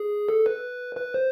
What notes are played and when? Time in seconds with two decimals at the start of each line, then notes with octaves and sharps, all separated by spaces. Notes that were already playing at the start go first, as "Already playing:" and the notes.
Already playing: G#4
0.29 A4
0.46 B4
0.97 B4
1.14 C5